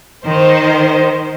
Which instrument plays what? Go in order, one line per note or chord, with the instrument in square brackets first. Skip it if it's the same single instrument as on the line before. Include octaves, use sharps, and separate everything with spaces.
[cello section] D#3 [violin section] C5